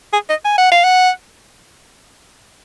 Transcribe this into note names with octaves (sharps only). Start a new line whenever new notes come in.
G#4
D#5
G#5
F#5
F5
F#5